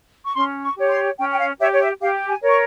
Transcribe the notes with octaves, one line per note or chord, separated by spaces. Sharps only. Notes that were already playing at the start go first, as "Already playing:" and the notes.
C#6
C#4 C6
C#6
G4 C#5
C6
C#4 G5
G5
F5
G4 C#5 E5
C#5
E5
G4 F5
G#5
A#4 C#5
C#6